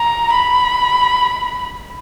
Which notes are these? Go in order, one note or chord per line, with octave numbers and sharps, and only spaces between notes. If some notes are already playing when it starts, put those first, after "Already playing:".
Already playing: A#5
B5